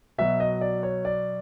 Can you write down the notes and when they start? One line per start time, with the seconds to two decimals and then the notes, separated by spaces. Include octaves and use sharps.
0.18 B2 F#3 E5
0.40 D#5
0.61 D5
0.83 C#5
1.05 D5